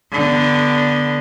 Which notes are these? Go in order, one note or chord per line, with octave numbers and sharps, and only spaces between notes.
D3 B3